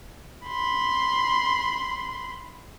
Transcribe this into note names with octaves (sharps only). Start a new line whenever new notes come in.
B5 C6